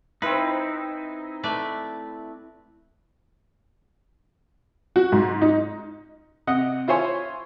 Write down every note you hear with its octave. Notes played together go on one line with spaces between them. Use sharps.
C4 D#4 E4 B4
A3 B4 D5
F#4
G#2
D#4
C3 D#5 F#5
E4 F4 C5 C#5 G#5 C6